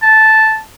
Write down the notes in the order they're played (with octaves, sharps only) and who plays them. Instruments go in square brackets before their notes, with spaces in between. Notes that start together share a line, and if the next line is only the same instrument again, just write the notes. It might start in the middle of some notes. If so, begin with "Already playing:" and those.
[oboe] A5